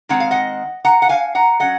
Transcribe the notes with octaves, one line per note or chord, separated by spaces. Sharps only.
D#3 G#3 C4 F#5
F5
D#5 F#5
F#5 A#5
F#5
F5 G#5
F#5 A#5
F#3 C#4 D#5 F#5